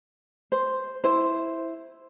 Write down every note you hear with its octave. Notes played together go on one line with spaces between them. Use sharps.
C5
E4 C5